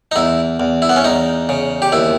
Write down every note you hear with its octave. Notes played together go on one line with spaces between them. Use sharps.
D#4
E2 E4
E2
E4
B3
C#4
E2 D#4
C#3
G4
D#2 E4